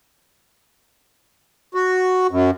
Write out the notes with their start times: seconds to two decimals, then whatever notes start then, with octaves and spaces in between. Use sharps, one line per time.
1.74 F#4
2.31 F#2